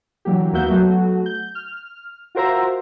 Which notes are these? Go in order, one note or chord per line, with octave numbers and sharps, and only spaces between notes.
D3 E3 F#3 A#3 G4
D#2 A#3 B3 F#4 E5 G6
F#3 A3 B3 F#4
G6
F6
F4 F#4 A#4 C5 E5 A#5